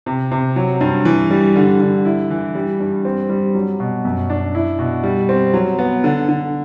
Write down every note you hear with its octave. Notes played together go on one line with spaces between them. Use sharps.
C3
C3
F#3
G2
E3
G3
D3
D3
E4
E3
G3
G2
C4
G3
F#3
B2
F#2
D4
E4
B2
G3
C4
F#3
B3
D3
D3